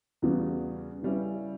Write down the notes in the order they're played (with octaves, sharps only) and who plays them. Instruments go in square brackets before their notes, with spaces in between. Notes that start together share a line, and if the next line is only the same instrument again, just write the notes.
[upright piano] E2 C#3 G3 B3 F#4
C#3 G3 C#4 E4 B4